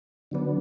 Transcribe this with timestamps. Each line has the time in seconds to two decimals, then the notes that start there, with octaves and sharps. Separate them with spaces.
0.31 D3 F#3 B3 D4